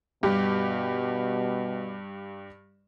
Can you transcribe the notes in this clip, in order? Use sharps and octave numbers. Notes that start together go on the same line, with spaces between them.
G2 B2 G4